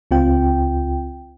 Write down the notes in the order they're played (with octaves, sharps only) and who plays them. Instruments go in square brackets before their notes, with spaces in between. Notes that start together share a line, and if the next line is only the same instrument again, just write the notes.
[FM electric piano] C#2 C4 F4 G5